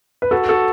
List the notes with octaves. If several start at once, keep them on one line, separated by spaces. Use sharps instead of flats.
B4
F#4 A4
F#4 A4